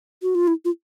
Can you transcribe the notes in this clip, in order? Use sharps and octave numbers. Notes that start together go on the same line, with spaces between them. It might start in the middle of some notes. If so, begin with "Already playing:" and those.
F#4
F4
E4
F4